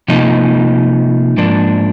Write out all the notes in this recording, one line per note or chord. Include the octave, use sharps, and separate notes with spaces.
C3 F3 A#3 D#4
G#2 F3 A#3 D4